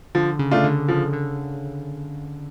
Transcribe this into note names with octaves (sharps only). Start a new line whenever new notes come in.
D3 F3
C#3
A3 D4 F4
D3
C#3 F3
D3